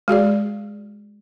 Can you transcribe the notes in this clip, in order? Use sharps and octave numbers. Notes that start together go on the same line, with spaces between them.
G#3 F#4 G#4 D5